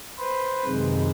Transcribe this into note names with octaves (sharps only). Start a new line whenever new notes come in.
B4 C5
F#2 C3 D#3 G#3